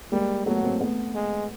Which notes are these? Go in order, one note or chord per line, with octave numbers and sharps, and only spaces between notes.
G3 G#3 A#3
F#3 A3 B3
A#3 C4
A3 B3
G#3